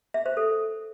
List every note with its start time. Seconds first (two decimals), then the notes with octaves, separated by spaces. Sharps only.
0.14 E5
0.26 C5
0.37 A4